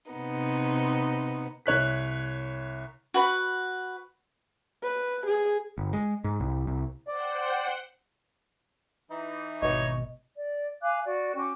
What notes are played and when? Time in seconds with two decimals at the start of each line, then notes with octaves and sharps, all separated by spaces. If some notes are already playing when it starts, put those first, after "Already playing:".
0.12 C3 B3 D#4
1.66 C2 C#5 F#6 B6
3.14 F#4 B4 B5
4.83 B4
5.26 G#4
5.78 G1
5.93 G#3
6.24 G#2
6.40 C2
6.67 C2
7.08 C5 D5 F#5 G5
9.11 E3 D#4
9.62 G#1 B2 C#5 D#5
10.36 D5
10.81 F5 G#5 D6 F#6
11.04 F#4 D5
11.35 C#4 F#4 G5 D6